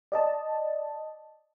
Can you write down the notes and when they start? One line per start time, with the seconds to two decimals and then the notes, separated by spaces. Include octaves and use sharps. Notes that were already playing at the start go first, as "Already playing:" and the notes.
0.12 D5 D#5 A5